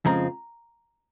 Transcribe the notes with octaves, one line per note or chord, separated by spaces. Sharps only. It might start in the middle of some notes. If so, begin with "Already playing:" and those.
F2 C#3 F3 G#3 C4 A#5